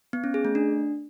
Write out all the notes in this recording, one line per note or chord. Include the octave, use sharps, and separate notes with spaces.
B3
C#4
G#4
A3
D4